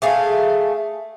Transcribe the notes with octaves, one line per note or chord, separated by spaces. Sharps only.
A3 G#4 F5